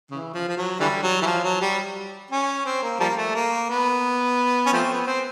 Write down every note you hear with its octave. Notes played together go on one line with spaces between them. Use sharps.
C#3 E3
F3
F3
F#3
D3 E3 G3
F#3
E3
F3
F#3
G3
C#4
C4
A#3
F3 G3 A#3
A3
A#3
B3
C#4
F3 A3 C4
B3
C4